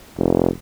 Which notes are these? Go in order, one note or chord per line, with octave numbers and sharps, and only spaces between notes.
F1